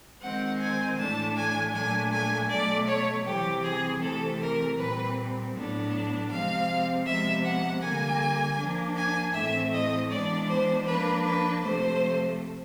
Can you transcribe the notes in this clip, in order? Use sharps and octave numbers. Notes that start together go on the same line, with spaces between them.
D#3 G#3 C4 F#5
G#5
A2 E3 A3 D4 A5
G#5
A#2 F#3 A3 D4 G#5
G#5
B2 F#3 A3 D5
C#5
C3 E3 G3 C4 G4
G#4
C3 E3 A3 C4 A4
A#4
A#2 G3 C4 B4
A2 F#3 B3 D4
C3 F3 G#3 C4 F5
C3 F3 G#3 B3 E5
F#5
D3 G3 A#3 G#5
F3 A#3 D4
G#5
A2 E3 A3 C4 E5
D#5
E3 G#3 B3 D4 D5
C5
F3 A#3 D4 B4
B4
C3 F3 A3 C5